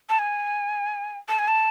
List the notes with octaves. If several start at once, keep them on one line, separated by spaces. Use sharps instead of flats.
A5
G#5
A5
G#5
A5